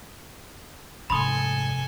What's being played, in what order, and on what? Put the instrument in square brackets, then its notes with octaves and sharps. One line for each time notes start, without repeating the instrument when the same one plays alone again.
[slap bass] F1 [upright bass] G#2 [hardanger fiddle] A4 G#5 [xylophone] B5 C6 D#6